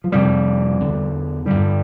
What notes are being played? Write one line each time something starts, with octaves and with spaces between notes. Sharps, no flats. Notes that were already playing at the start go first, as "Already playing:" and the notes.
F3
F2 C3 G3
E2 D3
G2 D3 G3